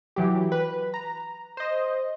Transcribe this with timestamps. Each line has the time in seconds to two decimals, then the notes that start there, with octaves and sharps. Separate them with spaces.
0.16 E3 F#3 G4
0.52 B4
0.94 A#5
1.57 C5 D#5